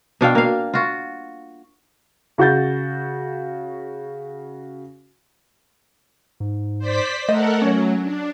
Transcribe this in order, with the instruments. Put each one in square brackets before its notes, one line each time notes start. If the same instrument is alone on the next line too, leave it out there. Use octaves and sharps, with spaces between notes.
[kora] B2 D4 F5 G5
A#3 F5
F4 F#4
[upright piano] C#3 F#4 F#5 G6 A6
[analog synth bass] G#2
[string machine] C5 D5 B6
[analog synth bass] A3 [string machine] A4 A#4 F#5 [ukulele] D#5
[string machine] F#3 [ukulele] C#4 C#5
[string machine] D4